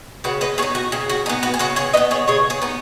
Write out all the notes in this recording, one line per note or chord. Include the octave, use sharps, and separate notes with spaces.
C#3 F#4 B4
B4 D#5
B3 D#4 G#4 C#5
F#4
C#3 G#4
F#4
B3 D#4 G#4
F#4 B4
G#4
C#3 F#4 B4
G#4 C#5
D#4 B4 D#5
B3
G#4 C#5
C#3 G#4 C#5
G#4 C#5
B3 D#4